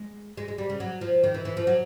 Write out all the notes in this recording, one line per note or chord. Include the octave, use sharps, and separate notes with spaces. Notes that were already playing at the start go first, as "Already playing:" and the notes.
Already playing: G#3
G#3
G#3
G3
C#3
F#3
F3
D#3
E3
E3
F3
F#3